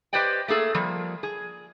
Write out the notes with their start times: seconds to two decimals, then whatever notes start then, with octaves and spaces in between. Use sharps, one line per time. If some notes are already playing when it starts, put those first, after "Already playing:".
0.13 G4 B4 C5 D5 D#5 G5
0.48 A3 A#3 G#4 A4
0.75 F3 G3 A#3
1.23 G#4